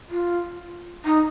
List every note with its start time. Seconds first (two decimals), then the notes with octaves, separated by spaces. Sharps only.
0.10 F4
1.05 D#4